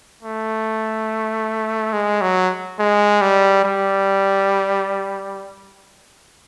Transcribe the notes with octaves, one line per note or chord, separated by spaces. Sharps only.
A3
G#3
F#3
G#3
G3
G3